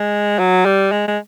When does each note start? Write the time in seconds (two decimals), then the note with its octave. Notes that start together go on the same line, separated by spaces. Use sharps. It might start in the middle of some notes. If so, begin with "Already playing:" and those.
Already playing: G#3
0.39 F#3
0.65 G3
0.92 G#3
1.07 G#3